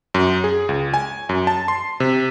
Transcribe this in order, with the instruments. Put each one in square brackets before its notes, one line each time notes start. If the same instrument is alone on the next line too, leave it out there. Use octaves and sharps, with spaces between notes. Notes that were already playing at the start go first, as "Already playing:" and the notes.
[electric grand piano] F#2
G#4
C#2
G#5
F#2
A5
C6
C3